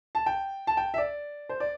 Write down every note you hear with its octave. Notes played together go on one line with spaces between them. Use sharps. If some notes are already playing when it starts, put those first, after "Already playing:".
A5
G5
A5
G5
E5
D5
C5
D5